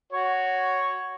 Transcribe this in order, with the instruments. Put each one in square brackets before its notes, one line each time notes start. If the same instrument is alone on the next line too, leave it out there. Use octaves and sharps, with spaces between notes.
[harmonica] F#4 C#5